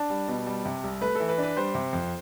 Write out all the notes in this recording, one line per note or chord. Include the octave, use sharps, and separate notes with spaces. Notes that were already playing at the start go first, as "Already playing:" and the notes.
Already playing: D4 A5
G3
B2
G3
C3
C2
A3 B4
E3 A4
B4
D4
B4
G3 C5
C3
F2